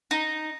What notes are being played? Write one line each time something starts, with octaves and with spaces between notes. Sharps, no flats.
D#4